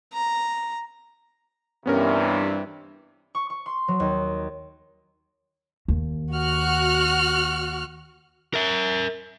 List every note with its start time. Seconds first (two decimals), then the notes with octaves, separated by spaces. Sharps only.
0.13 A#5
1.86 G2 C3 E3 B3 C#4 A#4
3.35 C#6
3.50 C#6
3.66 C6
3.88 F#3
4.00 D#2
5.88 D#2
6.35 F#4 F6 F#6
8.54 A#4 E5